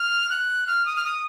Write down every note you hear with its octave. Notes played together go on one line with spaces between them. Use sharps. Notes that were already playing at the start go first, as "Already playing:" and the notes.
Already playing: F6
F#6
F6
D#6
F6
D#6